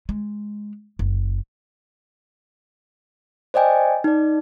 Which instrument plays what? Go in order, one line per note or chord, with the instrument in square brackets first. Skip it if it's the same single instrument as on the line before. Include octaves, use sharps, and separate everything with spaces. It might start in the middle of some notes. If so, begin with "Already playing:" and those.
[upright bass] G#3
F#1
[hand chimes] C5 D5 D#5 G5 G#5
D#4 D5